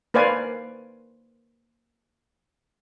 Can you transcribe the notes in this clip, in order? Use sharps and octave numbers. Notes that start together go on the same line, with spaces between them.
A#3 B4 C5 D5 F5 G#5